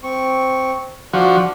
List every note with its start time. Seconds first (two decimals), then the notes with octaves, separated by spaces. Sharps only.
0.03 C4 C#6
1.13 F3 D4 F#4